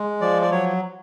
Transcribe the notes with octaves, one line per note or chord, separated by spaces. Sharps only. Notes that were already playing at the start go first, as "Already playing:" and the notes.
Already playing: G#3
F3 D5
D5
F#3 C#5